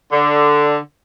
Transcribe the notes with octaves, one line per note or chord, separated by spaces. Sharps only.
D3